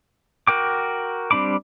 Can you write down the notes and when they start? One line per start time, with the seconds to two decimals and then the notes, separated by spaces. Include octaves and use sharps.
0.47 F#4 A#4 G5 D6
1.31 G3 C4 D4 B5 D6